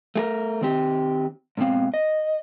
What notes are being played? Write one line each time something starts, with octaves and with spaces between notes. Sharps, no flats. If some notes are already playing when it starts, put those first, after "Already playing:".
A3 G#4 A#4
D#3 C4 G4
G#2 B2 E3 C4 F5
D#5